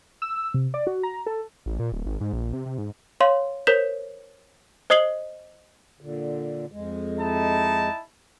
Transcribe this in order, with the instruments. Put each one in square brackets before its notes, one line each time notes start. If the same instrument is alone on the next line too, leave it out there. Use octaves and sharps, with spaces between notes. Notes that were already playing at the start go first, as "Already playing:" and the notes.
[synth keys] E6
C3
D5
F#4
A#5
A4
[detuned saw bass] A1
A#2
D1
G#1
G#2
A#1
C3
C3
G#2
[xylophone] C#5 F5 C6
A#4 C5 C#5 G6 B6 E7
C5 D#5 D#6 C7 F#7 G7
[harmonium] A#2 D3
F2 G#3
[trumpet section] D#4 E4 A5